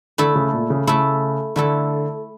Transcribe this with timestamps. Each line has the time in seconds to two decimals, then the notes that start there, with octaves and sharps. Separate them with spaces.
0.18 D3 A3 E4 A4
0.35 C#3
0.53 A#2
0.70 C#3
0.87 C#3 A3 E4 A4
1.56 D3 A3 E4 A4